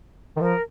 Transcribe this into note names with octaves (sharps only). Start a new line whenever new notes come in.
D#3
F3 A#4